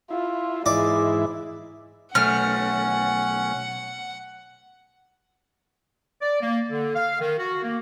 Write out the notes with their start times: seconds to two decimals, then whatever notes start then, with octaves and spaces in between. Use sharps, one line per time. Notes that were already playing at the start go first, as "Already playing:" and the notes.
0.10 E4 F4
0.66 G#2 E3 G#3 E4 D5
2.15 B1 A3 C#4 F#5 F6
6.22 D5
6.42 A#3
6.70 D3
6.95 F5
7.21 D#3
7.39 F#4
7.63 A#3